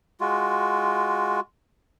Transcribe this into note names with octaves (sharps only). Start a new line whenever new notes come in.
G#3 F4 F#4